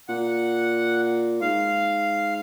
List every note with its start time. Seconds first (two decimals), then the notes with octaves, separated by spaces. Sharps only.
0.08 A#2 F#5
1.41 G#2 F5